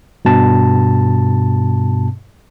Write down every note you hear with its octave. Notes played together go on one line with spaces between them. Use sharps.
G2 B2 A5